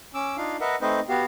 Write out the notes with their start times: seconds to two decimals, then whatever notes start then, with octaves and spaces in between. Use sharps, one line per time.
0.14 C#4 D6 E6
0.37 D4 D#4 F4 F5
0.61 A#4 B4 D#5 E5 F#5
0.81 A3 C4 D#4 B4 C5 D#5
1.09 B3 F#4 G4 F5